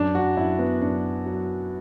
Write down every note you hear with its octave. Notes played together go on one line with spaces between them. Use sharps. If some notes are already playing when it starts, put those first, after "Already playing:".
Already playing: F#2 D4
F#4
F#2 E4
B3
F#2 D4
F#3